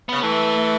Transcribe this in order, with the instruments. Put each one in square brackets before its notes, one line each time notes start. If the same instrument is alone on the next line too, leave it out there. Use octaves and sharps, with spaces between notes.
[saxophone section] C#3 [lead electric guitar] B3
[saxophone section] E3 [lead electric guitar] A3